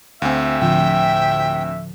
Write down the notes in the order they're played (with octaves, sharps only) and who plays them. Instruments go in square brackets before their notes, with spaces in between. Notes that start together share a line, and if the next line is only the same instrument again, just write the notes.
[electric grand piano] D2 C4 [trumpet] E5 [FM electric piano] F5 G5 G#5
[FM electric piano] A2 D3 F3 [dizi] G5